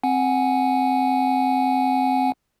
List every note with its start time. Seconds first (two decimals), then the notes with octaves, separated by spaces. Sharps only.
0.03 C4 F#5 G#5